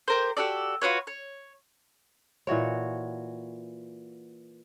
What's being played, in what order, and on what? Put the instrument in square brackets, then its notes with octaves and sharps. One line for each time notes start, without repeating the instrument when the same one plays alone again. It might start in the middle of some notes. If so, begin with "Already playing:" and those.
[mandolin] G4 A#4 C5
F#4 G4 A4 D5
F4 F#4 B4 C#5
C#5
[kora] A#2 E3 F#4 C#5